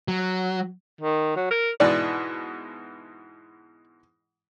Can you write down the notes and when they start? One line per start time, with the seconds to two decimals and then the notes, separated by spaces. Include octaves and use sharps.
0.08 F#3
1.01 D#3
1.36 F#3
1.51 A#4
1.80 G#2 B2 E3 D5